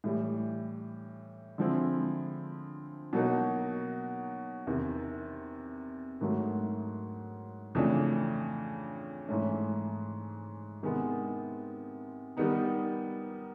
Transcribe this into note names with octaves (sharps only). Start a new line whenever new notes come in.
A2 E3 G3
D3 F3 G#3 C4 E4
B2 F#3 A#3 D#4 F#4
E2 C3 D#3
G#2 D#3 F#3 A3
F2 C#3 E3 A3 D4
G#2 E3 A3 C#4
C3 D#3 G#3 B3
D#3 G3 B3 D#4